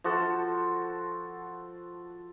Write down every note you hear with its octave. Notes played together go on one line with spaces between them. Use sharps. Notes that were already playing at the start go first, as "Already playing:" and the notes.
F3 F#4 A4